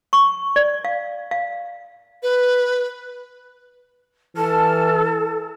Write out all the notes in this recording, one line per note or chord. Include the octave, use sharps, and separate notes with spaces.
C#6
D5
F5
F5
B4
E3 A4 A5 F6